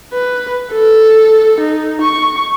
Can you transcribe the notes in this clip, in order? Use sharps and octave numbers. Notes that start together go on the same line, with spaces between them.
B4
A4
D#4
C#6